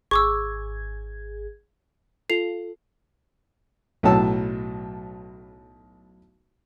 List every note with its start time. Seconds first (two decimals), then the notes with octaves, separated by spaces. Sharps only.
0.11 G#1 G#4 C#6 D6 E6 G#6
2.30 F4 A4 C7 F7
4.03 B1 A2 F#3 A5 E6